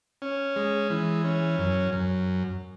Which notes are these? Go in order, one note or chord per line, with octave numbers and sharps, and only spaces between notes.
C#4
G#3
E3
C#4
F#2
F#2